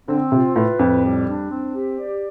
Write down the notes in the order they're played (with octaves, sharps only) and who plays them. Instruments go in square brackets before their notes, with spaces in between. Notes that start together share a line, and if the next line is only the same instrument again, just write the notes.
[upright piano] D3 [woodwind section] C4
[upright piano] C3 [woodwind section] F4
[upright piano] A2 [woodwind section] B4
[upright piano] F2 [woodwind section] A2
[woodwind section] G3
D4
C4
G4
D5